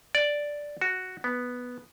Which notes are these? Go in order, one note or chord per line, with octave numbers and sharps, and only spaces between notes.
D5
F#4
B3